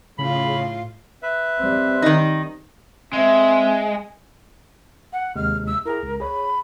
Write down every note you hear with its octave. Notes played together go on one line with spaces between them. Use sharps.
A2 C#3 F4 B5
B4 E5
G3 C4
D#3 D#4
G#3 C4 E5
F#5
D#2 C3 G#3 F6
E6
E4 G#4 A#4
C#2
G#4 C#5 B5